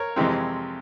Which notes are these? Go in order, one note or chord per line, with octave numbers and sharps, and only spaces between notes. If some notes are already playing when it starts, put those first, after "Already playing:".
Already playing: A#4 C#5
F2 C3 E3 G#3 C4